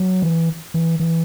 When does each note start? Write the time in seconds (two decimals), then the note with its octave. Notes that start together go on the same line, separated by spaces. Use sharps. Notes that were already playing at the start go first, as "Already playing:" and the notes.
Already playing: F#3
0.22 E3
0.74 E3
1.00 E3